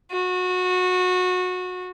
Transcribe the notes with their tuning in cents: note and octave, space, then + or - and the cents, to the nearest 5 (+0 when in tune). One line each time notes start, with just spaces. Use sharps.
F#4 -25